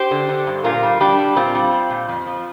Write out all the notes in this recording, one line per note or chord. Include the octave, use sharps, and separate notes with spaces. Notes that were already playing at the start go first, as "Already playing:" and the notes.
Already playing: G4 C5
D3
D3
G2
A#2 F4 A#4
G3
G3 D4 G4
G3
A#2 C4 F4
G3
G3
A#2
F2
F3